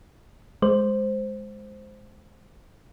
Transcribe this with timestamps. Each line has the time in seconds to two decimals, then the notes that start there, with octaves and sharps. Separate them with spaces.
0.62 G#3 C5